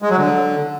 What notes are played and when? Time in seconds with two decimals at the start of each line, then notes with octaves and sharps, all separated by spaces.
0.02 G#3
0.10 F#3
0.17 D3